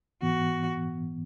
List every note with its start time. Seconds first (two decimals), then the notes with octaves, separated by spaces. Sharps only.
0.22 G#2 E3 B3 F#4